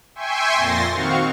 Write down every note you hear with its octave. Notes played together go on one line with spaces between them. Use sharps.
E5 G5 G#5 C6 C#6
F2 A#2 C6 A6 A#6
D#3 C4 F#4 F5 C#6